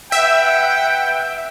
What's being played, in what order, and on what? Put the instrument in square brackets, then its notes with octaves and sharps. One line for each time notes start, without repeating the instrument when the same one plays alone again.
[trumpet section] B4 F#5 G5 [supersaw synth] E5